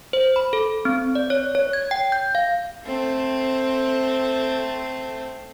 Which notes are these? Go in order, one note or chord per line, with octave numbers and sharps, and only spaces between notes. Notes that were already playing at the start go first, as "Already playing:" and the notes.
C5
B5
A4
C4
D5
C#5
C#5
G#6
G5
G6
F5
A3 C4